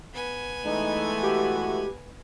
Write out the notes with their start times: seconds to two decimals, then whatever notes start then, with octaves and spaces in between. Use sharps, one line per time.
0.13 B3 G#5
0.65 E3 G#3 A3 D#4
1.23 F#4 G4